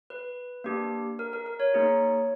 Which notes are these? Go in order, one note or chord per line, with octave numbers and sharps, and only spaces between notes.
B4
A#3 D4 G4
A#4
A#4
A#4
C#5
A#3 D#4 G#4